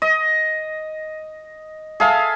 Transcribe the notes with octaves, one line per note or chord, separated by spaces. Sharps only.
D#5
G#4 A4 E5 F5